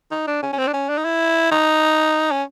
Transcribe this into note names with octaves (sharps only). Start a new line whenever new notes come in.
D#4
D4
C#4
C#4
C4
D4
C#4
D4
D#4
E4
D#4
C#4